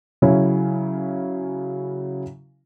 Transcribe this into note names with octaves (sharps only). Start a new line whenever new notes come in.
C#3 F#3 C#4 E4